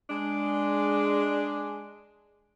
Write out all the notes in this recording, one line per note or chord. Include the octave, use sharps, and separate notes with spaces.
G#3 D4